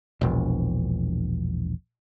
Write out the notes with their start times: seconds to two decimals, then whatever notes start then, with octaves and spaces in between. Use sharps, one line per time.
0.21 E1 A#1